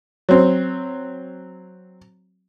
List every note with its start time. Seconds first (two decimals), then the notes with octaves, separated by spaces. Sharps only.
0.29 F#3 C4